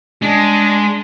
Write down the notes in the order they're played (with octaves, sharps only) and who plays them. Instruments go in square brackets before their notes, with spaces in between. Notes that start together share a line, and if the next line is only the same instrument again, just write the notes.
[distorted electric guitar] G#3 [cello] D4